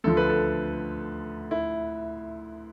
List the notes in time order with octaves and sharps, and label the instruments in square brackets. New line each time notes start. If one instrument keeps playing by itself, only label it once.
[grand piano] D2 D3 F3 A4
B4
A4
E4